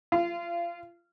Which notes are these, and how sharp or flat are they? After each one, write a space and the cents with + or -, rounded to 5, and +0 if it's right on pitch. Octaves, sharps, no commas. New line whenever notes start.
F4 -25